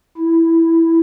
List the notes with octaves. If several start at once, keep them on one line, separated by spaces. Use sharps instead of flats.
E4